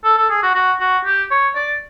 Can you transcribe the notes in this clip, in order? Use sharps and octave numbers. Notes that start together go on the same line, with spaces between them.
A4
A4
G#4
F#4
F#4
F#4
G4
C#5
D5